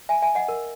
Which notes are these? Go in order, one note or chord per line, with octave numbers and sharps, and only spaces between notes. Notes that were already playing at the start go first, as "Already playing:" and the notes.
E5 G#5
E5 G#5
D#5 F#5
A#4